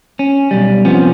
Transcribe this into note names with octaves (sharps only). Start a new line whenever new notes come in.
C#4
B1 G3
C3 F3 B3 C#4